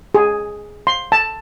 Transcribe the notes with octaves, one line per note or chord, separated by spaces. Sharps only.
G#4
C6
A5